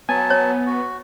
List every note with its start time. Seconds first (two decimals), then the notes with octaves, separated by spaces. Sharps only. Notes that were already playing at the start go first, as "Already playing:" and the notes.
0.09 F#3 B3 G#5 A5
0.30 C#5
0.66 F#4